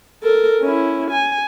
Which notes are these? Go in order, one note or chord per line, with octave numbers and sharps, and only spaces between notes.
A4 A#4
C#4 E4
G#5